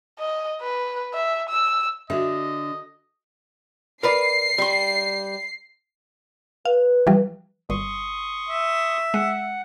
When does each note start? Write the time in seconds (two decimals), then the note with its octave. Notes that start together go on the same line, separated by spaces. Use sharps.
0.19 D#5
0.62 B4
1.14 E5
1.50 E6
2.10 D3 F#4 D#5 E5
4.03 A#4 B4 D5 C7
4.58 G3 C6
6.65 B4 F5
7.07 E3 F3 G3
7.70 G1 C6 C#6 D#6
8.49 E5
9.14 G#3 F#5